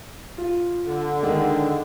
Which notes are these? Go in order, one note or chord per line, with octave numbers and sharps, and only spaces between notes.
F4
D3
D#3 G#3